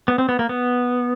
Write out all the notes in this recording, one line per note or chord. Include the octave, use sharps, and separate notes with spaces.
B3
C4
B3
A#3
B3